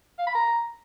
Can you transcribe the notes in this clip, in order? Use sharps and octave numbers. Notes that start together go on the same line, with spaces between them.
F5
B5
A#5